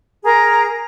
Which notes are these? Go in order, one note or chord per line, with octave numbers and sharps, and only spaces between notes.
G#4 A#4 A#5